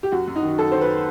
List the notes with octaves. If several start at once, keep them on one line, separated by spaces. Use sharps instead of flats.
G4
F#2 F#4
F#2
D#4
D#3
F#2 A4
D#3 C5
B4